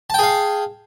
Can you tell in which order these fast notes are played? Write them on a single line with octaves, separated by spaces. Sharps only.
A5 G5 G#4 F5